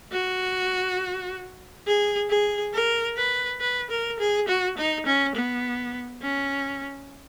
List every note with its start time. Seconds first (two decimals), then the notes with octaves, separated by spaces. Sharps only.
0.12 F#4
1.87 G#4
2.30 G#4
2.73 A#4
3.17 B4
3.60 B4
3.90 A#4
4.19 G#4
4.48 F#4
4.77 D#4
5.06 C#4
5.35 B3
6.22 C#4